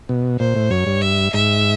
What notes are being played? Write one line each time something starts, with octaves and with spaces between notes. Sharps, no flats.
B2
A#2 C5
A2
F#2 C#5
G2
E5
G#2 E5